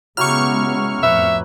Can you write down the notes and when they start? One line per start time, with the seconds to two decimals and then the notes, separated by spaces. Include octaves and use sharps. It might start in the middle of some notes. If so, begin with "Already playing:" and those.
0.17 C#3 F#3 G#3 B3 E4 G4 C#6 F6
1.03 F2 A2 B4 E5